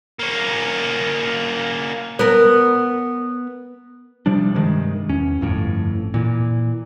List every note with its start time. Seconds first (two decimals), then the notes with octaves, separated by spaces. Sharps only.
0.19 A#3 C#4
2.19 B3 A#4
4.26 C3 F3 G3 D4
4.55 G2 C3 D#3 G#3
5.09 E2 C#4
5.41 G1 F2 A2
6.14 A#2 E3